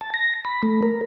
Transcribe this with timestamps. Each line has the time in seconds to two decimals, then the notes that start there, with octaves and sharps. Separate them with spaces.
0.01 A5
0.14 A#6
0.45 B5
0.63 A3
0.82 A#4